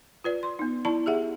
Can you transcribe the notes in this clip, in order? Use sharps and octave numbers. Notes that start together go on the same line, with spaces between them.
F4 B4 D5
C6
B3 D#4
E4 D5 A5 B5
G4 G#4 E5 F#5